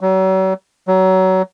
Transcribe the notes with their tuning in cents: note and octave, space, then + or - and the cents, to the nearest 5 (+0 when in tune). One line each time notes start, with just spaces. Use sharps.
F#3 +40
F#3 +25